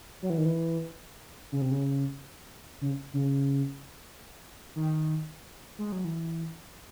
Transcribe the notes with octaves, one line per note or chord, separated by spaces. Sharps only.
F#3
E3
D#3
E3
C#3
C3
C#3
C#3
C#3
D#3
G#3
F#3
E3